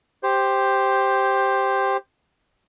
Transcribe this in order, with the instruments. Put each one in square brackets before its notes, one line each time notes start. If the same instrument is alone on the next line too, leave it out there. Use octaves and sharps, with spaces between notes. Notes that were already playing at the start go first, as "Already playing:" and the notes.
[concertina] G4 C5